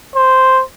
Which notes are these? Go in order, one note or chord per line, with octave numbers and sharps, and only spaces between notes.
C5